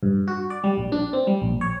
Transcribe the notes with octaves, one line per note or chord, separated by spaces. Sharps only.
G2
F#4
D5
G3
A#1
D4
C4
G3
A#1
C#5